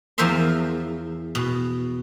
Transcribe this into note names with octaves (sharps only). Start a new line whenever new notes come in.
E2 F3 A#4 C5 E5 C6
B2